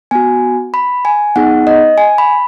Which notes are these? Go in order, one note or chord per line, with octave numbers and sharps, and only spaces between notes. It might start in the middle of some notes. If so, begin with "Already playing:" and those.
B3 F#4 G#5
B5
G#5
B3 D#4 G#4 F#5
D#5
G#5
B5